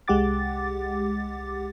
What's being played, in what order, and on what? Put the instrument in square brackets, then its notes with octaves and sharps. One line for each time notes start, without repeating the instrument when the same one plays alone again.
[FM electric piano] C2 G#3 G4 F#5 D6 A6